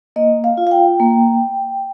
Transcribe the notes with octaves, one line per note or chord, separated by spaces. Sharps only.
A#3 D#5
F5
F4
F5
G5
A#3